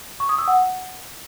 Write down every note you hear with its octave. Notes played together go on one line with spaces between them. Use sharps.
C#6
D#6
E6
F#5